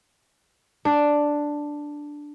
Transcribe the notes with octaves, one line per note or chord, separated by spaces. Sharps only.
D4